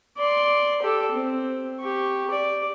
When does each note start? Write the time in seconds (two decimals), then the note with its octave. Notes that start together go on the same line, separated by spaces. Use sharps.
0.17 D5 C6
0.82 G4 A4
1.12 C4
1.80 G4 C#6
2.30 D5